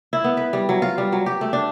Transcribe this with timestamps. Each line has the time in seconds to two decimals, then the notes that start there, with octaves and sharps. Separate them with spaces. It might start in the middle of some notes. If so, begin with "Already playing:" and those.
0.13 E4
0.24 B3
0.37 B4
0.53 G3
0.69 F#3
0.82 F4
0.98 G3
1.12 F#3
1.26 G4
1.41 A3
1.53 D4